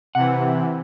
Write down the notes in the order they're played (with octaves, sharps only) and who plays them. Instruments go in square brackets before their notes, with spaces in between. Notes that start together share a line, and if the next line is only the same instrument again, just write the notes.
[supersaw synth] C3 E3 [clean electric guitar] F#5